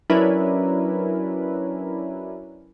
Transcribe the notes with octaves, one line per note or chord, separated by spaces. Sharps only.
F#3 C#4 D4 E4 A#4 B4